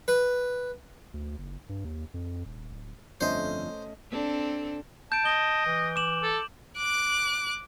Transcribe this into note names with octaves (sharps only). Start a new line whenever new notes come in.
B4
D2
F#1
G2
D#2
F2
D#1
D1
G1 F2 A3 C#4 D4 C5 D#5
C4 D4 A4
A5 G6 D7
D#5 G7
E3
D6 E7 F#7
A4
D6 F#6